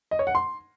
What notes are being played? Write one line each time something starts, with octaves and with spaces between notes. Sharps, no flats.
D#5
C#5
F#5
C6